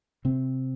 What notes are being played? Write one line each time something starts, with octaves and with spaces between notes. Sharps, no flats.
C3 C4